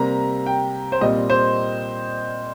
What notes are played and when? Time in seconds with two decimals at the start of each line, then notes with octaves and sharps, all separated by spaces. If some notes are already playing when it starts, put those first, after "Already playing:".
Already playing: C3 G3 A#3 A#5
0.46 G5
0.92 C5
1.01 A#2 G3 C4 D#5
1.30 C5